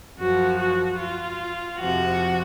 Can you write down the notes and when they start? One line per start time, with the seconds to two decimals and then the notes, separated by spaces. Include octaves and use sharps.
0.18 F#2 F3 F#4
0.58 F#4
1.00 F4
1.80 F2 C3 F3 F#4